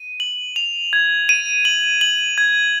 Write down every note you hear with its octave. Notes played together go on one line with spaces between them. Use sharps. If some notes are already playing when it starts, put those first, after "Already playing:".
Already playing: D#7
F#7
F7
G#6
D#7
F#7
F#7
G#6